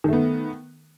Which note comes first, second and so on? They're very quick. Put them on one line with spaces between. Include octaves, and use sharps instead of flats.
D#3 A3 B3